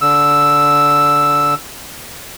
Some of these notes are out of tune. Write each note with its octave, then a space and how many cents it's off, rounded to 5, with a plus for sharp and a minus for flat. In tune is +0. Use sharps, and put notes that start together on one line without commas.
D3 -20 E6 +0